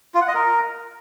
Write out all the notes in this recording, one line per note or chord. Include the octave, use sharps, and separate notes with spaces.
F4
F#5
D#5
A#4